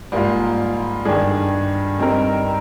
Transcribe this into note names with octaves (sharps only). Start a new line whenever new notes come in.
G#2 G3 A#3 F4
G2 D#3 G3 D4 G#4
G2 G3 C4 D#4 A#4